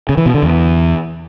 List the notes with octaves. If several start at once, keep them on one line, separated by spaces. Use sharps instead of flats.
C#3
E3
B2
D3
E2